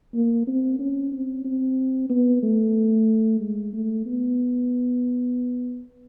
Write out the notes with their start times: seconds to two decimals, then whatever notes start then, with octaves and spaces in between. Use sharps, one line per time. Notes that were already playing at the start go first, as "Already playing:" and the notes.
0.14 A#3
0.47 C4
0.79 C#4
1.12 C4
1.45 C4
2.10 B3
2.43 A3
3.40 G#3
3.73 A3
4.06 B3